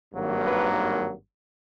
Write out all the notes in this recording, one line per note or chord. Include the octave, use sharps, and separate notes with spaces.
G#1 G2 D#3 F#3 A#3
B4